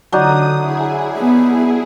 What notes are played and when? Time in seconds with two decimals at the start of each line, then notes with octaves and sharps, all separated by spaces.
0.12 D3 F#3 D4 D#4 D#6
0.61 E4 G#4
1.18 B3